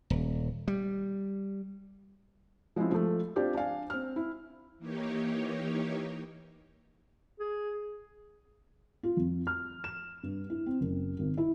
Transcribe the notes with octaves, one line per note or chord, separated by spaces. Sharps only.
D#1
G3
F3 G#3 C4 C#4 E4
F3 A3
C4 D4 F4 G4 C5 D5
D4 D5 F5 G#5
C4 F6
E4
E3 A#3 D#4 G4 C#5
G#4
F4
F2
F6
E7
G2
E4
C4
F#1
G#1
E4